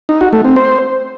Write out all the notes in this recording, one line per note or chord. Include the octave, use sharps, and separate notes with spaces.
D#4
F#4
A3
C4
C5